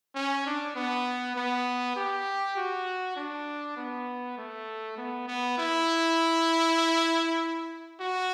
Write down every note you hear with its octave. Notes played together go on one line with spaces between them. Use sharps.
C#4
D4
B3
B3
G4
F#4
D4
B3
A3
B3
B3
E4
F#4